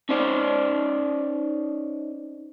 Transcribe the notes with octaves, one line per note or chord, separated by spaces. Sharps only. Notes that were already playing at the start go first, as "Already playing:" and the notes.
C#4 D#4 C5 D5